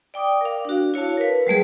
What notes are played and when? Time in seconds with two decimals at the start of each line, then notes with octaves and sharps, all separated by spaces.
0.14 D5 G5 D6 D#6
0.41 A#4 F5
0.65 D4 F#4
0.94 E4 C#5 F5 A5
1.17 A#4 B4
1.47 F#3 G3 A3 G#4